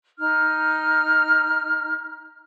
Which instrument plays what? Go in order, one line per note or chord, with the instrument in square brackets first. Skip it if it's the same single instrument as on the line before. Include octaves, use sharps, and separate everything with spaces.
[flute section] D#4 F6